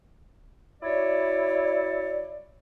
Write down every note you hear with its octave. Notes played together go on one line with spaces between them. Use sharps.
E4 F#4 C#5 D5